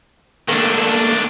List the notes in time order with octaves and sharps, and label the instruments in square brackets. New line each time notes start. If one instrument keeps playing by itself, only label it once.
[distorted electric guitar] D#3 D4 [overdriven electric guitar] A3 A#3